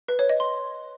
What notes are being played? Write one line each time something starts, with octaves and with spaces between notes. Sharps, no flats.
B4
C#5
D#5
C6